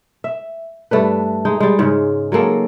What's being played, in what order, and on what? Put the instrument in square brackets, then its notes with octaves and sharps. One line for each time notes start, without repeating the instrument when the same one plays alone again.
[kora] E5
G2 A3 D4 B4
G#3 D#4
G3 G#3
G#2 C#3
F#3 G#3 A#3 A4